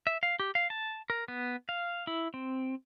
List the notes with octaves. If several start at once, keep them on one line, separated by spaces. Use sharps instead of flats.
E5
F5
G4
F5
A5
A#4
B3
F5
E4
C4